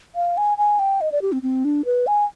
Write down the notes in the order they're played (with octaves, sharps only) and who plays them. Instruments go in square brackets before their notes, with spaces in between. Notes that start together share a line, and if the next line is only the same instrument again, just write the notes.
[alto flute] F5
G#5
G#5
G5
D#5
D5
G4
C4
C4
D4
B4
G#5